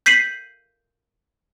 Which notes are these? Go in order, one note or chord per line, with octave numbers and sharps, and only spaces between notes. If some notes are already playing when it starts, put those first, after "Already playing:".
G6 B6 C7 D#7 F#7